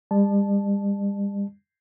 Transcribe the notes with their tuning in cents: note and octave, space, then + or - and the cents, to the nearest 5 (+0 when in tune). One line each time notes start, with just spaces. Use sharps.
G3 +40 D5 +45 A5 -15